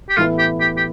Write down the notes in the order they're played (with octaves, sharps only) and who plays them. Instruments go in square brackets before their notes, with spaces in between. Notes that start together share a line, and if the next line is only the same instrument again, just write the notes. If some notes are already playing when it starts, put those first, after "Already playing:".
[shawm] G4
[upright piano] A2 E3 B3 E4 B4 [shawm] F4
[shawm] G4
G4
G4